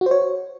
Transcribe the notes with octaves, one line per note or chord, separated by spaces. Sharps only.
F#4
C5
C#5